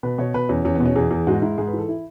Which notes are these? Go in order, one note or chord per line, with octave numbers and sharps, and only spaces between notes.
B2 B4
B2 C#5
B2 B4
E2 C#4
E2 C#4
B3
B2
C#4
E2 G#4
E2
G#2 F#4
G#2 E4
G#2 G#4
B4
E3 A4
E4